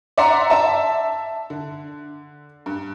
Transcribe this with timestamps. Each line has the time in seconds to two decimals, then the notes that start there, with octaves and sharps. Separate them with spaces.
0.18 D5 E5 F#5 A#5 C6
0.50 E5 A5
1.50 D3
2.66 G2